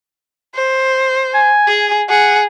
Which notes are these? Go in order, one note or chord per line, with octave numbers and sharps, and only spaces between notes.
C5
G#5
G#4
G#4 F#5